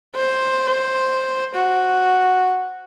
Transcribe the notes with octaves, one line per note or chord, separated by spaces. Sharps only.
C5
F#4